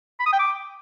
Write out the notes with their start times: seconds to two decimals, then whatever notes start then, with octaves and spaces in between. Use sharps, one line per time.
0.20 B5
0.26 D#6
0.33 G5
0.40 D6